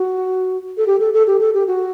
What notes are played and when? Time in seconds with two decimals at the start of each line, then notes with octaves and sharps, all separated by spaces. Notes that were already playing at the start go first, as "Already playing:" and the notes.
Already playing: F#4
0.77 A4
0.87 G4
1.00 A4
1.13 A4
1.27 G4
1.40 A4
1.54 G4
1.68 F#4